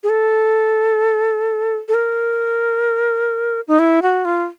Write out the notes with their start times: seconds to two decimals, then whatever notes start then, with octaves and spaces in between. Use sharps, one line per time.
0.03 G#4
0.09 A4
1.88 A4
1.94 A#4
3.68 D#4
3.79 E4
4.02 F#4
4.25 F4